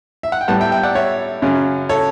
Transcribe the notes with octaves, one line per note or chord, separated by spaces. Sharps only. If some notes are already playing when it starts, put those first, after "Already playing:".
E5
F#5
G5
A2 G3 B3 F#5 A5
E5 G5
E5 G5
D5 F#5
C#5 E5
F#2 C#3 F#3 C#4
A4 C#5